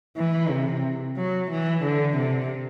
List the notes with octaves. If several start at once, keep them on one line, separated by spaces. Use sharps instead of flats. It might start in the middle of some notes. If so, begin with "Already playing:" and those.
E3
C3
F#3
E3
D3
C3